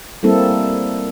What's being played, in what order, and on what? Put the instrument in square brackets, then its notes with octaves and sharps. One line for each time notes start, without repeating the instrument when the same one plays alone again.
[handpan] G3 A#3 C4 E4 A4